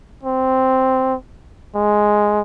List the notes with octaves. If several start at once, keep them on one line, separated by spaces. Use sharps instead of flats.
C4
G#3